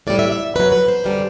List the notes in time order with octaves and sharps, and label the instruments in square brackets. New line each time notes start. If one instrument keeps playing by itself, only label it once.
[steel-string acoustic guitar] A2 G3 D5
E5
E5
F#2 F#3 B4
B4
C5
F#2 D3 G3